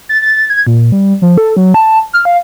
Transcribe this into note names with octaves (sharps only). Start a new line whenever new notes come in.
A6
A6
G#6
A#2
G3
F3
A4
F#3
A5
F6
F5